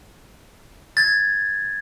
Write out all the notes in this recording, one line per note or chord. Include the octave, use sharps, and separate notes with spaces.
G#6 A6